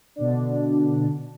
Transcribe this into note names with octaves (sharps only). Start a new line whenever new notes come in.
B2 D3 D4